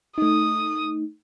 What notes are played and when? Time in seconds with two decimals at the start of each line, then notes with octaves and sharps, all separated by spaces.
0.18 A3 D#4 D#6